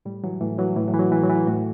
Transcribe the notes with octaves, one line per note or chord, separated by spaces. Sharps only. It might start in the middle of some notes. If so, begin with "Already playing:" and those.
A2 G3
E3 F#3
A2 E3
E3 F#3
A2 E3
F#3
E3
F#3
A2 E3
F#3
E3
E4
A2 F#4